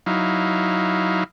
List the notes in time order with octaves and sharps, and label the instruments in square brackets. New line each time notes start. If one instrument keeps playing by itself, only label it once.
[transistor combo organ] F#3 D#4 E4 F5